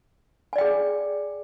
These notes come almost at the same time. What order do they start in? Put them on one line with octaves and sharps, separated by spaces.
G#5 D5 G5 G#4